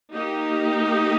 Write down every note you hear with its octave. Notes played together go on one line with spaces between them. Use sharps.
A#3 D#4 G4